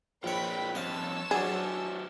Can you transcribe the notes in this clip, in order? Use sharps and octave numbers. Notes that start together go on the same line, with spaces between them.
A#1 F4 A#4 B4 C#5 G5 B5
F3 G3 C4 C#5 D#5 F5 A5 E6
F#3 D4 F#4 G#4 B4 C5